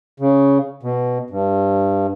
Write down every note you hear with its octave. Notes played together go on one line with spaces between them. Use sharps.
C#3
B2
G2